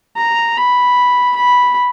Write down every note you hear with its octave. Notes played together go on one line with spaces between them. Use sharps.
A#5
B5
B5